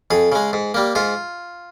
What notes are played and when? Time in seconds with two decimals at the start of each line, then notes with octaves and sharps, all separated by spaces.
0.11 F2 G#4
0.32 C#3 G#3
0.53 G#2
0.74 G3 A#3
0.95 G#2 F4